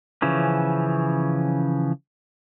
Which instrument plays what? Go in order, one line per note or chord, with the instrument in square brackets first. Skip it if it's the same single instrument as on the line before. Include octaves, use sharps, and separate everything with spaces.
[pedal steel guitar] C#3 E3 F3 C#4